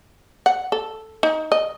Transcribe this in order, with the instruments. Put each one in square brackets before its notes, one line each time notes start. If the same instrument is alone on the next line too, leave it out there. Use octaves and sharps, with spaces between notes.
[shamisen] F#5
A4
D#4
D#5